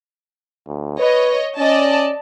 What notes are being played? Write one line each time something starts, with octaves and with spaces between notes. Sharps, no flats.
D2
B4 C#5 D#5
C#4 D5 D#5 A5